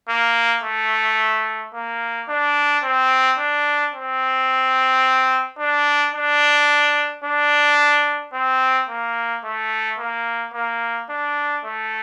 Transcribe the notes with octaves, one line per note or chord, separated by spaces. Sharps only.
A#3
A3
A#3
D4
C4
D4
C4
D4
D4
D4
C4
A#3
A3
A#3
A#3
D4
A3